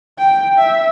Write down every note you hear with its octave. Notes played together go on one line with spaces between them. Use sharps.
G5
E5